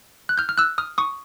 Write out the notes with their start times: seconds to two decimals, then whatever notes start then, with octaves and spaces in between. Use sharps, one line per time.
0.29 F#6
0.38 F6 G6
0.49 F6
0.58 E6 F#6
0.78 D#6 F6
0.98 C#6 D#6